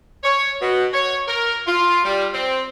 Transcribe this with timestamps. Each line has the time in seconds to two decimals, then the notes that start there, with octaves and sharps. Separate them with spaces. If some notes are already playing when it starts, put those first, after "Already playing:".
0.24 C#5
0.62 B2
0.93 C#5
1.28 A#4
1.67 F4
2.05 G3
2.33 C4